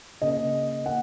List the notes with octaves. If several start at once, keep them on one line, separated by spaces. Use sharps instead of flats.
C#3 A#3 D#5
A#3 F#5